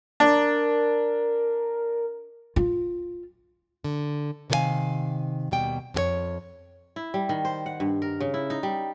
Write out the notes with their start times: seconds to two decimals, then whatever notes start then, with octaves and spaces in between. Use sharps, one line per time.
0.20 D4 A#4
2.56 F4
3.84 D3
4.50 C3 D#3 G#4 A4 F5 G#5
5.51 D#2 B2 G3 G5
5.94 F2 G4 C#5
6.96 E4
7.14 G3
7.29 D#3
7.45 C5
7.66 F#5
7.80 G2
8.02 A#4
8.20 C#3
8.34 E4
8.50 D#4
8.63 G3